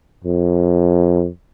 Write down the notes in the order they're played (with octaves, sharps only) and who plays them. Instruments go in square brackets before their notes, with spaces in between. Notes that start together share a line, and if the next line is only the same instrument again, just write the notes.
[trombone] F2